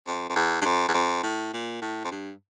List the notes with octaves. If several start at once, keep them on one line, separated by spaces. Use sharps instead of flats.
F2
F2
E2
G2
F2
E2
F2
A2
A#2
A2
F2
G2